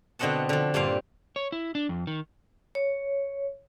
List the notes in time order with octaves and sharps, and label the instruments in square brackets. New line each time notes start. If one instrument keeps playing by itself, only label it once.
[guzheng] B2 D3 C4 D#5 F#5 A5
D3 F3
G2 A#2 C4 F5
[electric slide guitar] C#5
E4
D4
F2
D#3
[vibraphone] C#5